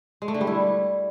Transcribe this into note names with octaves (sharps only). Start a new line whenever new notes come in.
G#3
A3
D3
G3
E4